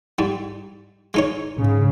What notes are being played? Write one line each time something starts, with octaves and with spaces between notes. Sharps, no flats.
G#2 G3
G#3 D#4 C#5
G#2 C#3